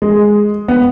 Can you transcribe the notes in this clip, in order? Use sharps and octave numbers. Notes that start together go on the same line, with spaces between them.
G#3
B3